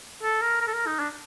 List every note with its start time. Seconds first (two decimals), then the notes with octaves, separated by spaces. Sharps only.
0.23 A4
0.42 A#4
0.61 A#4
0.68 A4
0.74 A#4
0.87 D#4
0.99 D4